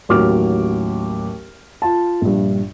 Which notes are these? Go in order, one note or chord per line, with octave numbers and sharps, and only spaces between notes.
A1 D#2 F#3 D6 F6
F4 A5
A#1 G2